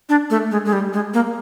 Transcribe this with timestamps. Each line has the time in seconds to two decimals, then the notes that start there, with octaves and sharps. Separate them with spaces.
0.09 D4
0.30 A3
0.51 G#3
0.65 G#3
0.73 G3
0.93 G#3
1.14 A#3